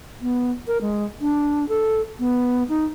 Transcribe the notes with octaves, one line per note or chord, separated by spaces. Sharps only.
B3
A#4
G#3
D4
A4
B3
D#4